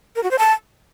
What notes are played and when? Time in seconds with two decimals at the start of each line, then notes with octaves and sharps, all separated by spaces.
0.16 A#4
0.23 F#4
0.31 C5
0.39 A5